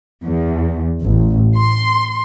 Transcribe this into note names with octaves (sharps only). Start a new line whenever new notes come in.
E2
A1
C6